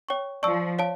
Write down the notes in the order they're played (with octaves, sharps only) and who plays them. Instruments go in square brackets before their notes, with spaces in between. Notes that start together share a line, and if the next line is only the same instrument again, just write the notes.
[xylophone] C#5 G5 C#6
[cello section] F3 [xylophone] D5 A5 C#6 E6
[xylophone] C#5 F5 A5